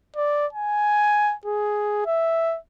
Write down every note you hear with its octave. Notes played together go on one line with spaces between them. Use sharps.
D5
G#5
G#4
E5